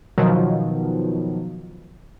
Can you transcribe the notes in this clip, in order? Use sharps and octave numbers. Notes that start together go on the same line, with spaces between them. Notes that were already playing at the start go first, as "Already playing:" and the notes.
B2 D#3 F3 F#3